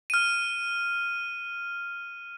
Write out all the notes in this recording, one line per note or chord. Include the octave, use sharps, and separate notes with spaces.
F6 D#7